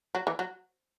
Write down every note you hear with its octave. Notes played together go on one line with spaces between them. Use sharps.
F#3
E3
F#3